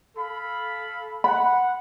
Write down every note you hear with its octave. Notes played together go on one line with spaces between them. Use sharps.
A4 F5 B5
F#5 B5